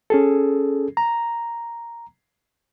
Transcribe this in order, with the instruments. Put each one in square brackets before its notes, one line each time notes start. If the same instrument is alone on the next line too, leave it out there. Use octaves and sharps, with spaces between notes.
[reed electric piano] C#4 G#4 A4
A#5